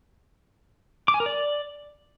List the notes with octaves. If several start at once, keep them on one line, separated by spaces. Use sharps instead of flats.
D6
G#5
A#4
D5